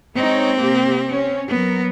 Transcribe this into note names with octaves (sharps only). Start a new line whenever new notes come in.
G#3 C4 D#4 C#5
C3 A#3 G4
C#4
F#3 B3 A#4